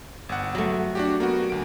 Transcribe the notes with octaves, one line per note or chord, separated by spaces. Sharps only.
G1 F#5
F#3 A3
D4 F#4 G4
A#3 B3 F#4
D2 D7